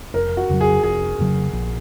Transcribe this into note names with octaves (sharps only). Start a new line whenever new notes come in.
F1 A#4
F#4
F2 C#3 F#3
G#4
F1 G#4
F2 C#3 F#3
A#1